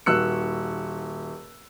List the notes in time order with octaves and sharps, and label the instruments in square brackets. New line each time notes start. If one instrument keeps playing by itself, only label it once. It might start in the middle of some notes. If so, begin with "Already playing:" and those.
[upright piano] D#1 F#4 E6 F#6 C#7